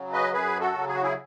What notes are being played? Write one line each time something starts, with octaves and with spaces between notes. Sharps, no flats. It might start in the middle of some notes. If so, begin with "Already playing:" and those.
Already playing: C#3 F#3
B4 D#5
F#2 G#4 B4
F#4 A4
C#3 F#3
G#4
F#4
E4 G#4